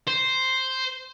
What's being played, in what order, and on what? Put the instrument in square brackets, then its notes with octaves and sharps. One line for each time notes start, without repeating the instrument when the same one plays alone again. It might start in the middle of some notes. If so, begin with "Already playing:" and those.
[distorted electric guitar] C5